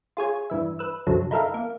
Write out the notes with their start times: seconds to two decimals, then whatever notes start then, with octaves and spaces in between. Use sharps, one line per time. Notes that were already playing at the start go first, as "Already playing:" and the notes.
0.17 F4 G#4 C#5 G#5
0.50 G2 E3 E5
0.79 B4 E6
1.07 C2 F#2 D3 F3 F#3
1.31 D#4 E4 A4 A#4 E5 F5
1.54 A#3